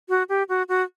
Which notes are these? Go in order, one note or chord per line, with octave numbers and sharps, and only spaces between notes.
F#4
G4
F#4
F#4